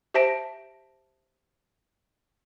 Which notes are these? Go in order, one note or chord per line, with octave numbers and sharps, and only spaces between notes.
G4 C5 E5 A5 A#6 D7